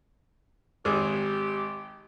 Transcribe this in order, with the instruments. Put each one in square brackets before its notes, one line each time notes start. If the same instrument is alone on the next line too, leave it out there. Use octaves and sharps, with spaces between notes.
[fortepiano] G#1 G#4 D6 [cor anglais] G4